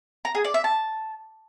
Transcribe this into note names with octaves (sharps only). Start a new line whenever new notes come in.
A#5
G#4
D5
E5
A5